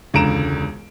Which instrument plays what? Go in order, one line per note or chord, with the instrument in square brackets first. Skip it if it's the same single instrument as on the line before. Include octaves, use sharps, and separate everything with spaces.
[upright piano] E1 C#2 D3 A#5 D7 E7